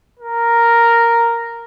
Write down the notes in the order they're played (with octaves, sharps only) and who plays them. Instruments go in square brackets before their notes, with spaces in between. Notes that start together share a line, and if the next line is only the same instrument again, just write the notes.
[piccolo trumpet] A#4